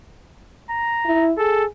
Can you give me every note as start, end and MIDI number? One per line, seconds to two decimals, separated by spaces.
0.70 1.26 82
1.05 1.32 64
1.38 1.65 68
1.38 1.64 69